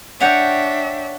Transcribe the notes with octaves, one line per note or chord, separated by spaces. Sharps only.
D4 C#5 E5 F#5 G5